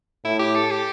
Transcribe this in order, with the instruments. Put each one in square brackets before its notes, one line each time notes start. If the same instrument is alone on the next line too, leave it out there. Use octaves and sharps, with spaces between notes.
[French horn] A2 [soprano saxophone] E4
[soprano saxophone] G4
A4
G4